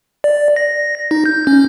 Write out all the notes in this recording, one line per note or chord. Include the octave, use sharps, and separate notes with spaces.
D5
A#6
D#4
G6
C#4